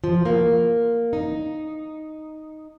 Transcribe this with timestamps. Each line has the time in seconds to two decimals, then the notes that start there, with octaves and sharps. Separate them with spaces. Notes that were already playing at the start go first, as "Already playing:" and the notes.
0.04 F3
0.25 A#3
1.13 D#4